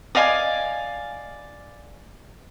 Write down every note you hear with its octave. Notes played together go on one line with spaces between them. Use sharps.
D5 D#5 F5 G#5